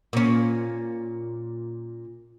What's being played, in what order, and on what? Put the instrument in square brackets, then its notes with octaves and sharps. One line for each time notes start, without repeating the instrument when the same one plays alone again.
[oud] A#2 C#4